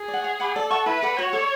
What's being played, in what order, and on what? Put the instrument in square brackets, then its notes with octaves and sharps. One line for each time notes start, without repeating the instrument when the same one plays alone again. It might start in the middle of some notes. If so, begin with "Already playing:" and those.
Already playing: [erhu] G#4
[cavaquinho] D5
F#5
C#5
F#5 B5 D6
[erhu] A4 [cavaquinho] D5
[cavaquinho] F#5 A5 C#6
[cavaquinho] E4 [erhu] B4
[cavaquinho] A4 D5 F#5
[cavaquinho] F#4 [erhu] C#5
[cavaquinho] A4 D5